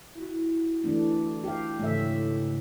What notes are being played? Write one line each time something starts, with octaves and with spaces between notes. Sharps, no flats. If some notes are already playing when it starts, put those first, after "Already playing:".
E4 F#4
E3 A3 D4
G4 F5
G#2 C#3 E3 A3 E5